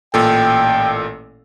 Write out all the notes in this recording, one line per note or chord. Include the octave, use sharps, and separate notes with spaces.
A1 A#2 A4 G5